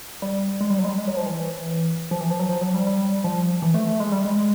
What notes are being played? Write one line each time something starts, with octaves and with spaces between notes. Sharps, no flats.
G3
G#3
G3
F#3
G#3
G3
G#3
F#3
F3
E3
F3
E3
F3
F#3
F3
F#3
G3
G3
F3
E3
A3
A3
G#3
G3
G#3